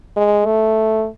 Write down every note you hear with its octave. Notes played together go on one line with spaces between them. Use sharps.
G#3
A3